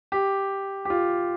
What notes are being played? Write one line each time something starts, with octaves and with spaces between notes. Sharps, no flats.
G4
G4
F4